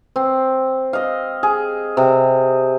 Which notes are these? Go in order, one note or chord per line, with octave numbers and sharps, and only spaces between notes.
C4
D#5 F5
G#4
C3